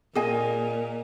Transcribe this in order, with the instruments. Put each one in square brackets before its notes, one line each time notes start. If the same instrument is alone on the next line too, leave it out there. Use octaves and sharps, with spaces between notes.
[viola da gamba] A#2 [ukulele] F4 G#4 D#5 G#5